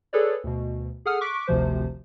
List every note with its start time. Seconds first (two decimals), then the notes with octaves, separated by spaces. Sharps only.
0.13 G#4 A4 B4 C#5 D5
0.44 D2 B2
1.06 G#4 A4 F#5 D#6 F6
1.21 C#6 D6 F#6 B6 D7
1.47 G#1 D2 C3 F3 C5